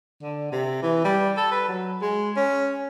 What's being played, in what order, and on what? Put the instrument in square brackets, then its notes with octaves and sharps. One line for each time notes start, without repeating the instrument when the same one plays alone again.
[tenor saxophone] D3
C3
E3
G3
A4
B4
F#3
G#3
C#4